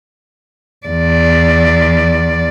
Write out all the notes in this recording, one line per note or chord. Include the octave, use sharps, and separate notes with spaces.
E2 D5